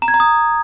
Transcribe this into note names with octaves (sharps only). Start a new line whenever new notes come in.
A#5
G#6
A#5
D#6